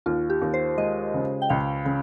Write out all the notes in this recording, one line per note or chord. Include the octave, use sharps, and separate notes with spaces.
D#2 F4
G4
D#2
C5
G#3 D#5
C#3
G5
C#2 F5
C#3